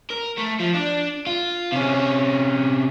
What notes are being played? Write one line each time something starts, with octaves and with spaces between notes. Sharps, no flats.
A#4
A3
F3
D4
F4
C3 C#4